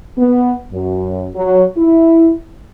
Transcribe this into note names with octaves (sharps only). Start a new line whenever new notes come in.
B3
F#2
F#3
E4